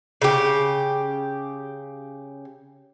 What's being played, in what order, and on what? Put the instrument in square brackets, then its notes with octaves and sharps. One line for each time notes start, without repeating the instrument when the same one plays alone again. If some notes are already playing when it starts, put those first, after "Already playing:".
[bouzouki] C#3 G4